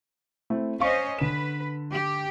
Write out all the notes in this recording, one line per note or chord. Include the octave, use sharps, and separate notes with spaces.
A3 C4 E4
C#4 C5 D#5 F5 C#6
D3 B4 E7
G4